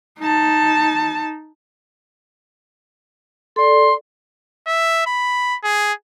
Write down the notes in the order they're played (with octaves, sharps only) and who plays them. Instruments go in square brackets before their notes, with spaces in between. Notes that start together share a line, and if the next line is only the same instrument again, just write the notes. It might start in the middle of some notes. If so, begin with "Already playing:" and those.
[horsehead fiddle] D#4 A5
[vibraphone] A4 D5 [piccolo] C6
[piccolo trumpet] E5
B5
G#4